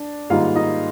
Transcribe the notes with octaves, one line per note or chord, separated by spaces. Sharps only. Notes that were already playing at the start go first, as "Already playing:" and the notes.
Already playing: D4 D5
G#2 D#3 G3 A#3 D#4 F4 F5
D#4 D#5